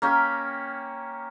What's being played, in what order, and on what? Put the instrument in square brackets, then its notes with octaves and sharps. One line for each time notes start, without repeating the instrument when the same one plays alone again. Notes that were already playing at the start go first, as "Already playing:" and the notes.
[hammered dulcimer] A#3 C#4 G4